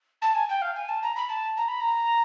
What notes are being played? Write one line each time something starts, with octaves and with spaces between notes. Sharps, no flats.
A5
G#5
G5
F5
G#5
A5
A#5
B5
A5
A#5
B5
A#5